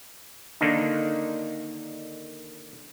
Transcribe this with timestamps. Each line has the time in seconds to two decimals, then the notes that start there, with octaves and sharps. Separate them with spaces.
0.61 D3 D#3 A#3 D4 D#4